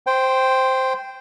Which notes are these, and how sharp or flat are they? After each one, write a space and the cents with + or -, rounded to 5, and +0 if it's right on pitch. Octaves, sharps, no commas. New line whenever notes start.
C5 +0 G5 +0 C6 -25